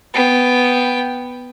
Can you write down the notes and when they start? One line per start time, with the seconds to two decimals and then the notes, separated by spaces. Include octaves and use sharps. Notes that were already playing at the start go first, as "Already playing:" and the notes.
0.14 B3 G5